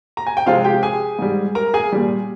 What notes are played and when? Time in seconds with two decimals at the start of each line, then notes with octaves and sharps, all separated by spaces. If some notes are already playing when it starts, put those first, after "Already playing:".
0.17 A#5
0.27 G#5
0.37 G5
0.46 C3 F3 G#3 F4 F5
0.65 G4 G5
0.83 G#4 G#5
1.19 G#2 G3
1.55 A#4 A#5
1.74 G#4 G#5
1.92 A#2 G3